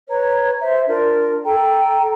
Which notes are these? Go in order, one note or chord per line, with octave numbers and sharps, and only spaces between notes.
B4 C#5 A#5
C5 E5
D4 F4 A#4 D5
A4 G5 A#5